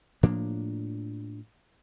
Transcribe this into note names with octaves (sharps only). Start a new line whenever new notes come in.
A2 F3 A#3 D4